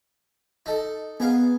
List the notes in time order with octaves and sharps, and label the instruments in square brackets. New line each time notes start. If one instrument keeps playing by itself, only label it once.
[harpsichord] D#4 A4
[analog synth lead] B3 [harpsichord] G#4 A#4 F5